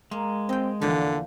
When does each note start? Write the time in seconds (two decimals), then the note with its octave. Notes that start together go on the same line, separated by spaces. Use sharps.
0.11 G#3 A#3
0.49 C4 D#5 G5
0.81 E2 A#2 D3 E3 F3